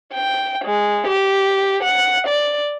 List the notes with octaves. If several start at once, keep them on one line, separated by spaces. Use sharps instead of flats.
G5
G#3
G4
F#5
D5